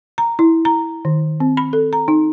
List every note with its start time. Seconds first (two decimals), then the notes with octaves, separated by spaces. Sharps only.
0.18 A#5
0.39 E4
0.65 A#5
1.05 D#3
1.40 C4
1.57 B5
1.73 A4
1.93 A#5
2.08 D#4